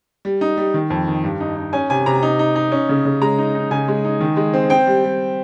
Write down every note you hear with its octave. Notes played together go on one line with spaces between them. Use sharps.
G3
D#4
G3
D#3
F2
D#3
G2
D#4
D#4
C#4 G#5
C3 G#5
C3 A#5
D#4
D#4
D#4
C#4
C#3
C#3
G#3 A#5
D#4
D#4
C#3 G#5
G#3
D#4
D#3
G#3
C4
C4 G5
G3
G3